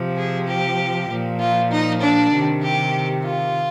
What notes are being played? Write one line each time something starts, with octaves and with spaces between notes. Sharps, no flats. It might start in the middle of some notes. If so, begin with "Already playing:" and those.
Already playing: C3 F3
G#4
G4
A#2 F3
F4
D#4
D4
C3 D#3
G4
F4